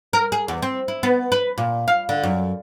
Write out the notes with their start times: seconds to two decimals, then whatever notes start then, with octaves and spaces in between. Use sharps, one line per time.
0.13 A#4
0.32 G#4
0.48 E2
0.62 C4
0.88 E4
1.03 B3
1.32 B4
1.58 A#2
1.88 F5
2.09 D3
2.23 F#2